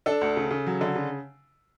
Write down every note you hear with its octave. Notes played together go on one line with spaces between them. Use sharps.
D4 A4
D2
C#3
C#3
F#3
D3
C#3